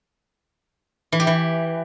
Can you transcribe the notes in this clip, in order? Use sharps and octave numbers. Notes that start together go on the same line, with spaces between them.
E3
G4
E3